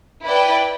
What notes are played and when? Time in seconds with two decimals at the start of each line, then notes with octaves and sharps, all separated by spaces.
0.24 E4 B4 D5 G5